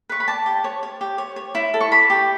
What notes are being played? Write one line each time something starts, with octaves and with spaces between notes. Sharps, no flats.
B4 C#6
B5
D5 A5
G4
C#5
C#5
G4
C#5
C#5
E4
A4
C#6
D5 B5
G4